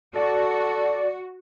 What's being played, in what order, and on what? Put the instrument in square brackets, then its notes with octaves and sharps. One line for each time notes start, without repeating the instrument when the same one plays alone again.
[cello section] F#4 [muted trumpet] A4 [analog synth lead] D5